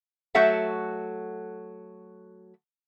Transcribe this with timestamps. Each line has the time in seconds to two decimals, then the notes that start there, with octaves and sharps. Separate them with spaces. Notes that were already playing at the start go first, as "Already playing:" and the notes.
0.35 F#3 A3 F#4 A4 E5 F#5